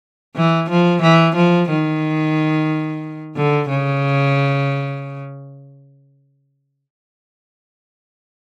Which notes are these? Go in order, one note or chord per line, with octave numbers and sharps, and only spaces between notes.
E3
F3
E3
F3
D#3
D3
C#3